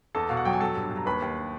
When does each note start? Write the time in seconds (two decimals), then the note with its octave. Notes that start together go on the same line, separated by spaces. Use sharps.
0.15 E2 A4 A5
0.29 B2 F5
0.37 F#5
0.45 F#3 G5
0.53 G#5
0.60 F#3 A4 A5
0.76 G2
0.91 G2
0.97 A#5
1.06 D#2 B4 B5
1.22 D#2